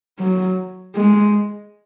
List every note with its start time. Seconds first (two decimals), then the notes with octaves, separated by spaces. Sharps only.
0.19 F#3
0.96 G#3